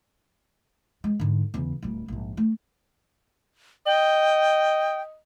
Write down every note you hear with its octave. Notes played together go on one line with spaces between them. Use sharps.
G#3
G#2 D3
E2 C#3
D1 G3
A#1 G#2
A3
D#5 G5